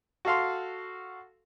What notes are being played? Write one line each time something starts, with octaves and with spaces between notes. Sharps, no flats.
F#4 A4 F5 C6